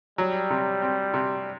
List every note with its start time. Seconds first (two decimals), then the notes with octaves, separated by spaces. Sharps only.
0.18 F#3 G3
0.50 C3
0.82 C4
1.14 C3